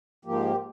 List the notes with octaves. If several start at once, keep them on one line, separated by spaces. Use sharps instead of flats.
G#2 F3 A#3 G4